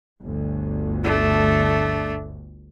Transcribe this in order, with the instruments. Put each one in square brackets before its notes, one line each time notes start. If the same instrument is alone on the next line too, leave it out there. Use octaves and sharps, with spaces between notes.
[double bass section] G1 D2
[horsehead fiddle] A3 D4